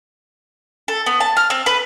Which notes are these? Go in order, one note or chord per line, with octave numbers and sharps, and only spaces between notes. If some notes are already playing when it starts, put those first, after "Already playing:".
A4
B3
A5
F6
C4
B4